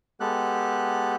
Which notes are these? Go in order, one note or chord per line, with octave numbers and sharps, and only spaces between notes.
G#3 B3 G4 A4 F#6